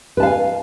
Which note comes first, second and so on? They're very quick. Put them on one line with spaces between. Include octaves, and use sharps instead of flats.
B4 A5 F5 G#5